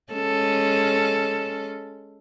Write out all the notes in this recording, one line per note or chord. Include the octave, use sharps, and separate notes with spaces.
G#3 C#4 A4